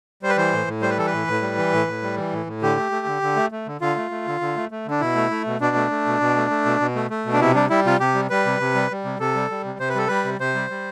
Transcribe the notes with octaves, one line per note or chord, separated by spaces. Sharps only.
G3 C5
B4
E3 C5
A2
A2
G3 C5
B4
E3 A4
B4
A2
A2
G3
E3
A2
A2
G3
E3
A2
A2
D3 G4
A3
A3
D3
D3
A3
A3
D3
D3 F4
A3
A3
D3
D3
A3
A3
D3 D4
B2 E4
A3
A3
B2
B2 D4
A3
A3
B2
B2
A3
A3
B2
B2
A3
A3
B2
D4
C3 E4
G3 D4
G3 E4
C3 F4
C3 G4
G3
G3 B4
C3
C3
G3
G3
C3
C3 A4
G3
G3
C3
C3 C5
B4
G3 A4
G3 B4
C3
C3 C5
G3
G3